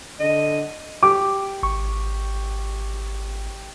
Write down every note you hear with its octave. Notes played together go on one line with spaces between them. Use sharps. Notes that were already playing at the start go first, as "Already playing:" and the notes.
D3 D#5
G4 D6
G#1 C#6